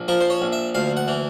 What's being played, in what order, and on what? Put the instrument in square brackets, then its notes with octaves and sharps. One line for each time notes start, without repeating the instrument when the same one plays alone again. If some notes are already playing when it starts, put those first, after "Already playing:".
Already playing: [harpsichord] A#1
F3 A#4
C5
C#5
A#1
E5
D2 F5
F#5
E3